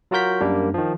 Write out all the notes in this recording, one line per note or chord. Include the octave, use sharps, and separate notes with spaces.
F#3 F4 F#4 A#4 G6 B6
F#2 G3 A#3 D4
D#3 F3